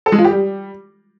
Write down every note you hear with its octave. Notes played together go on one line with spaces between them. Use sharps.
A4
G#3
F4
G4
G3